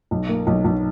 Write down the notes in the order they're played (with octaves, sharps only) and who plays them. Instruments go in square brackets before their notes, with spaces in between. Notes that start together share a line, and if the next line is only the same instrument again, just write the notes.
[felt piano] B1
A#3
B1
B1